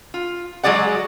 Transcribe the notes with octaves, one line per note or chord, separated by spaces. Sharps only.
F4
F#3 G#3 G#4 D5 F#5